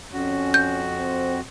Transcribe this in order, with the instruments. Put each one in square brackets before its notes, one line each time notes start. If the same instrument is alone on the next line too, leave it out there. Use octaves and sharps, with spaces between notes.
[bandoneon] F2 F#4 [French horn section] C#4
[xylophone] G6
[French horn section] C4